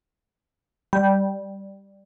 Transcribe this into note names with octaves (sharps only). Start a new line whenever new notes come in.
G3